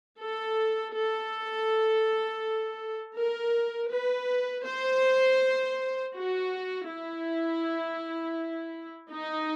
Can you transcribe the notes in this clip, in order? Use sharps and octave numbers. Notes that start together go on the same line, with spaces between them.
A4
A4
A#4
B4
C5
F#4
E4
D#4